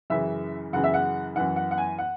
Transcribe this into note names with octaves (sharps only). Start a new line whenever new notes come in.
F#2 C#3 E3 E5
F#2 C#3 E3 F#5
E5
F#5
F#2 E3 F#5
F#5
F#5
G#5
F#5